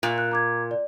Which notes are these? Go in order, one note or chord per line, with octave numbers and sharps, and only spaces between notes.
A#2
F#6
A#5 D6 G#6
D5